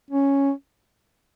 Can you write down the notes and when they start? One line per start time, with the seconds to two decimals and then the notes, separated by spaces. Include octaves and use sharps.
0.11 C#4